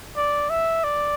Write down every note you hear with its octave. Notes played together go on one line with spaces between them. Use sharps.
D5
E5
D5